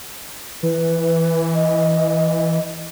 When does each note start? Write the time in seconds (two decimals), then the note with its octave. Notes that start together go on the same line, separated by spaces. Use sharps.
0.63 E3 B4
1.54 D#5